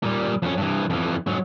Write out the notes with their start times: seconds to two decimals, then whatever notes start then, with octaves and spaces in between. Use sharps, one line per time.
0.03 A#2 G3
0.42 F2 C#4
0.57 G2 E3
0.90 F2 E3
1.27 G#2 F#3